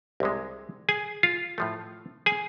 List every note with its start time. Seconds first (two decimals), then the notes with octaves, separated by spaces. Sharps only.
0.20 C2 C3 G#3
0.89 G#4 G#5
1.23 F4 F5
1.58 A2 F3 A3
2.26 G#4 G#5